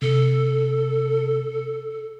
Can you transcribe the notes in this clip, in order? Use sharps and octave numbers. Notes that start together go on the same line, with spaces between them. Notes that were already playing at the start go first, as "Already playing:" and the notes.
C3 A4